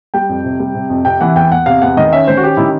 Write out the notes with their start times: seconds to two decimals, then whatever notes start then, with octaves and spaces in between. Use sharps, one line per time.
0.14 G3 G5
0.29 F2
0.44 C3
0.60 G3
0.75 C3
0.90 F2
1.05 C3 G5
1.21 E3 F#5
1.35 E2 G5
1.51 E2 F#5
1.66 C3 F5
1.82 E2 F#5
1.97 D#3 D#5
2.13 C#4 E5
2.27 D#3 C5
2.37 F#4
2.43 C#4 G4
2.57 D#3 E4